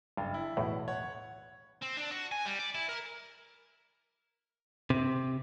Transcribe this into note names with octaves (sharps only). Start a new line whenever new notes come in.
F#1 G2
E4
B1 E2 A2
C#5 F#5
C4
D4
F#4
G#5
G3
D5
E4
A#4
C3